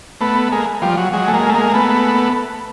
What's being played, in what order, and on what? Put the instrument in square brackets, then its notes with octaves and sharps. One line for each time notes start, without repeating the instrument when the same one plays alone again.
[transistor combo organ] A3 B3
G#3 A#3
F3 G3
F#3
F#3 G#3
A3
G#3 A#3
A3
G#3 A#3
A3 B3